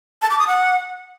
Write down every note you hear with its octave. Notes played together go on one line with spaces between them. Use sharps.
A5
D6
D#6
F#5